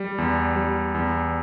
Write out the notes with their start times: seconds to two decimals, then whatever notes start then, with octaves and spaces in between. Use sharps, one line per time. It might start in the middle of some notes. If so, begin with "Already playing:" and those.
Already playing: G3
0.18 E2
0.56 G3
0.94 E2